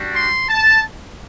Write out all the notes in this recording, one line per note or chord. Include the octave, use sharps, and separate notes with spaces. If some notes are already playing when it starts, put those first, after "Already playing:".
Already playing: G3 D4 F#4
C6
A5